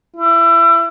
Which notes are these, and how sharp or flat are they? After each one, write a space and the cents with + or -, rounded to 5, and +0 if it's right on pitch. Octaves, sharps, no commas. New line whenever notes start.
E4 +30